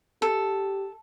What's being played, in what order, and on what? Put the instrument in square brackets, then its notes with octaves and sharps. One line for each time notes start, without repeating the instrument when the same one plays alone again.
[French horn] G4 [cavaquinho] A4